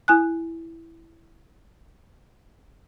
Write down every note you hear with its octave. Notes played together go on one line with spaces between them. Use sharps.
E4 G#5 F#6